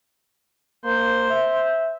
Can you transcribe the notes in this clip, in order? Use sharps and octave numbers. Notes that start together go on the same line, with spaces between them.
A#3 C5
E5